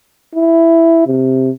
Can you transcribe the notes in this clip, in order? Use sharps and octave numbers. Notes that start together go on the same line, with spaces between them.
E4
C3